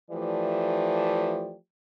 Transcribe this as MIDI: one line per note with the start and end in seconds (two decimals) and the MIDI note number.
0.11 1.55 52
0.11 1.55 53
0.11 1.55 57
0.11 1.55 67
0.11 1.55 74